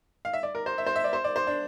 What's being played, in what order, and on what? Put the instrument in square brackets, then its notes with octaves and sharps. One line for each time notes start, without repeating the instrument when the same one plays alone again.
[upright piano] F5
E5
D5
A#4
C5
E5
C5
E5
D5
C5
D5
C5
D4